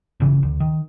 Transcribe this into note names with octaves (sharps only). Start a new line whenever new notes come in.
G1 C#3 E3
D2
D#3